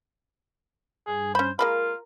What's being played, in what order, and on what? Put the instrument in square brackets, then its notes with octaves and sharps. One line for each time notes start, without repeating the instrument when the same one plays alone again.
[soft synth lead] G2 [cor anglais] G#4
[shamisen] C#4 B5 [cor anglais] C5
[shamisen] G#3 A#3 B5 [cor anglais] F4 [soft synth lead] A#4